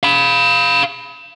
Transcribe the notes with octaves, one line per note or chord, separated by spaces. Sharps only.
F5 B5